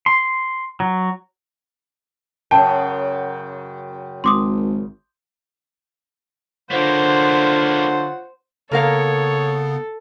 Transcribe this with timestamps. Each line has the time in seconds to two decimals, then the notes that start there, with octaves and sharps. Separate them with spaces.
0.06 C6
0.80 F#3
2.51 F#2 C#3 G5 A5
4.24 G#1 C6 D6 D#6
6.71 D3 A#3 B3 F4 C5 C#5 F#5
8.71 C#3 A#3 B3 A4 A#4 C#5 F5